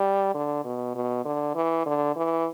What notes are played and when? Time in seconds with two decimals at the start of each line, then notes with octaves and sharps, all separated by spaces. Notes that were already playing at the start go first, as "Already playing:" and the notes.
Already playing: G3
0.34 D3
0.64 B2
0.95 B2
1.25 D3
1.55 E3
1.86 D3
2.16 E3